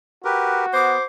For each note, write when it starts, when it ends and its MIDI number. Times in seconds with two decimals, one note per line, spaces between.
0.25 1.06 66
0.25 0.66 67
0.25 0.66 70
0.25 0.66 71
0.74 0.98 59
0.74 1.04 72
0.74 1.03 86